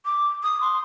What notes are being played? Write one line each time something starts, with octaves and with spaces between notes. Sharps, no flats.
D6
D#6
C6